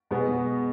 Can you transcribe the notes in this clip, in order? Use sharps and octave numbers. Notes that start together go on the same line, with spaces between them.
B2 G#3 B3